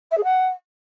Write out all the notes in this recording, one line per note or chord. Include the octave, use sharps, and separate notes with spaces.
E5
G#4
F#5